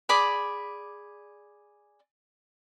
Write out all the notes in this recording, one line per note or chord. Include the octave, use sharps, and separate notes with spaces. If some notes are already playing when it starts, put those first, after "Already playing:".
G#4 D5 B5 D6